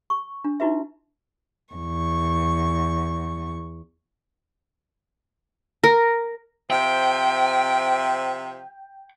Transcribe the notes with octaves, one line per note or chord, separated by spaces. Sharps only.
C#6
D4
D#4 E4 F#4 B4 E5
E2 C#6
A#4
C3 F3 E5 G5